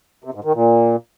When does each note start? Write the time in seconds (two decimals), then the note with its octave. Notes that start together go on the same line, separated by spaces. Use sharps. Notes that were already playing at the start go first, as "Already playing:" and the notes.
0.24 C3
0.34 G#2
0.44 D#3
0.54 A#2